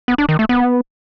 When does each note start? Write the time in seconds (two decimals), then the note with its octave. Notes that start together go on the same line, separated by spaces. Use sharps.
0.08 B3
0.18 D4
0.29 D#3
0.39 A3
0.49 B3